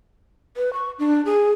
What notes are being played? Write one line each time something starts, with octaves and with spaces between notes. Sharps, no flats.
B4
C#6
D4
G#4